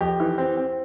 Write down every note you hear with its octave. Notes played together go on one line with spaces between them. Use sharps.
F2 G4
E3
C4
C4